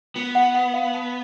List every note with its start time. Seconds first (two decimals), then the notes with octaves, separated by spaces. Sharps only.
0.15 B3 F4
0.35 F#5
0.55 F#5
0.74 F5
0.94 A5